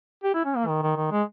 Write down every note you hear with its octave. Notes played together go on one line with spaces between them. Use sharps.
G4
E4
C#4
A#3
D#3
D#3
D#3
G#3